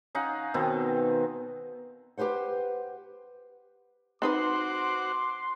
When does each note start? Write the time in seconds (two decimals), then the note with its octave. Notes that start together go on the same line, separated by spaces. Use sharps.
0.15 C#4 D#4 F5 F#5
0.54 B2 D#3 B3 C4
2.18 G4 G#4 B4 C5 F#5
4.22 C4 D#4 F#4 B4 C5 F#5 C6 D6